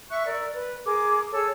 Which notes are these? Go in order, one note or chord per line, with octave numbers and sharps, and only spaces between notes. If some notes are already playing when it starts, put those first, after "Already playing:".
E5 C#6 F#6
A#4 D5 E6
B4
G#4 A#4 D6
G#4 A4 C#5 E6